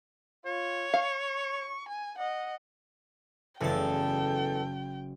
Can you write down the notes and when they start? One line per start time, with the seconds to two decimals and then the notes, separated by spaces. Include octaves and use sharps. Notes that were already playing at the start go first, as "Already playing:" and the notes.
0.46 F4 C#5
0.94 F5 C#6
1.88 G#5
2.18 D#5 F#5
3.61 F#1 E2 A2 A4 G5 A5